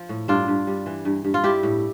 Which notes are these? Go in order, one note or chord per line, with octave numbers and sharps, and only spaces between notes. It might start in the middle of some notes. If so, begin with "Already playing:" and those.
Already playing: F3
A2
G2 D4 F4
G2
G3
E3
G2
G2
F4
G3 E4 G4
A2